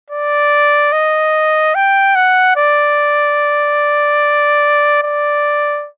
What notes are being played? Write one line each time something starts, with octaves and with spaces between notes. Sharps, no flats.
D5
D#5
G5
F#5
D5
D5